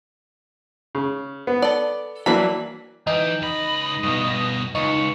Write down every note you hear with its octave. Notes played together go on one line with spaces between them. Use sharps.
C#3
B3
A4 D5
E3 F#3 G3 A#3 D4 B5
E3 D#4 G5
C#2 D#5 B5
G2 B2
C#2 D#4 C#6